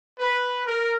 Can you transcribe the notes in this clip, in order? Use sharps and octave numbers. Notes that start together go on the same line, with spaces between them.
B4
A#4